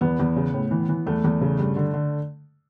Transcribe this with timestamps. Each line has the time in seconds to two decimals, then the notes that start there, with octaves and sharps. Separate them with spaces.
0.01 E2 B3
0.20 E2
0.36 C#3
0.54 A2
0.71 E3
0.89 E3
1.07 E2 A3
1.24 E2
1.41 C#3
1.58 G2
1.76 D3
1.94 D3